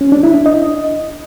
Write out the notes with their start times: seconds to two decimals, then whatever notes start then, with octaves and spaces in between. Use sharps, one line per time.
0.01 C#4
0.12 D4
0.23 E4
0.34 D4
0.46 D#5